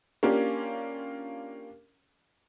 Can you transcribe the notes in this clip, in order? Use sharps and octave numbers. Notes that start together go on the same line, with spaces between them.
A#3 C#4 D4 F4 G4